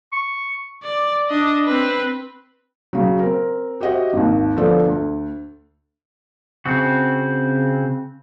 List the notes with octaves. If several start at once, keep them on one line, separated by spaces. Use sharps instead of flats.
C#6
D5
D4 D#5
C4 B4
C#3 F#3
C4 A#4
F#4 G4 C5 D#5 E5 F#5
G#1 D#2
D3 F3 B3 A4 C5 D5
D2
C#3 C4 F#4